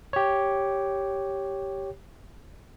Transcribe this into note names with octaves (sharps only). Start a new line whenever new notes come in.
G4 C#5